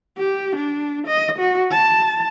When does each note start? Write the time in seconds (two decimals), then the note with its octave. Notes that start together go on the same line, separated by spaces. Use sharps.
0.18 G4
0.56 D4
1.07 D#5
1.39 F#4
1.71 A5